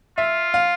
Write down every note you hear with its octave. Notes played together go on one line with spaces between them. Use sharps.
F4 E5
F5